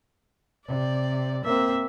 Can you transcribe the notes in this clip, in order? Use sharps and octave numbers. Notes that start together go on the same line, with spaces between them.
C3 D5
A#3 C4 E5